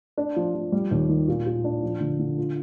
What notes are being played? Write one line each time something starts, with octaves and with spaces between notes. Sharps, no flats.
D4
F3
F3
G3
D#2
D#3
A#2
A#2
D4
F3
D3
D3
F4